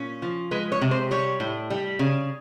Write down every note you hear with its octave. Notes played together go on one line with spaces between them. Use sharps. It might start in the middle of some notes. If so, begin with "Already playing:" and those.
Already playing: A#2 C#4
F3
G#3 B4
C#5
C3
C5
G3 C#5
A2
G3
C#3